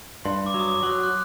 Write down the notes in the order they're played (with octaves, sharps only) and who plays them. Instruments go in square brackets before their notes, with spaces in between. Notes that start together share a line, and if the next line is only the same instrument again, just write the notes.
[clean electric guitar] G2 [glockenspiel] C6
[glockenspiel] D6
[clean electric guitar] F#3
[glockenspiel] D#6
D6
[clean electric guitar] F#3
[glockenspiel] F#6
F#6